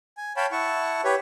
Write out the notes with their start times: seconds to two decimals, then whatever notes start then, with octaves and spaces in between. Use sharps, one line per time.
0.17 G#5
0.37 C#5 F5 G5 A5 B5
0.52 E4 F#5 A5 C#6
1.04 G4 B4 C#5